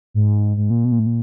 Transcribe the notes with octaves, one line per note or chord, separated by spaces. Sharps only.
G#2
G#2
A#2
B2
A#2
A2
A#2